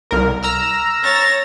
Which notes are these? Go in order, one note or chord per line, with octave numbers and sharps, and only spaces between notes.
C2 A#4
A#5 E6 F6
C#5 A6 A#6